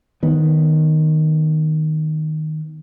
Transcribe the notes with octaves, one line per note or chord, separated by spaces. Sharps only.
D#3 B3